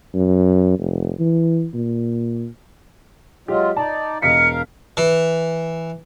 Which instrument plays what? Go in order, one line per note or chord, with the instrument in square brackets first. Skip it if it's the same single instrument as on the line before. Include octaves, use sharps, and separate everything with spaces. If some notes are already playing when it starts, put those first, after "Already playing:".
[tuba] F#2
F1
E3
A#2
[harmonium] F#3 G#3 F4 [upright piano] G4
[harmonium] D#4 D5 [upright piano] A5
[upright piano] E1 D#5 B6 [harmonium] A#4 F5 [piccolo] C#7
[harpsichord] E3